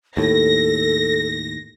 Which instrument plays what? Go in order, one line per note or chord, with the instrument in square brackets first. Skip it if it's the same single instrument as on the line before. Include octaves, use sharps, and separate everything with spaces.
[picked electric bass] D#2 A2 [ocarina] A4 [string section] A#6